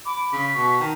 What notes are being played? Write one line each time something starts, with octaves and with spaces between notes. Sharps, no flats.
B5 D6
C#3 B6
B2 C#6
D#3 A5